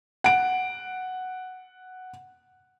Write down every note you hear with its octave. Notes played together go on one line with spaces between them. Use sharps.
F#5 D7